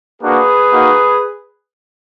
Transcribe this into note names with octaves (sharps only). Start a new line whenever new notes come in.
A#3 D4 F#4 G#4 B4
A#3 D#4 F#4